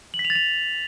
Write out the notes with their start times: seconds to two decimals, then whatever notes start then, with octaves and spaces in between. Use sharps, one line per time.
0.14 F#7
0.19 B6
0.25 F7
0.30 A6
0.35 F7